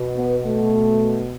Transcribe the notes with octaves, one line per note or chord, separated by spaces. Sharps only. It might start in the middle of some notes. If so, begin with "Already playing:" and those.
Already playing: B2
B3
A3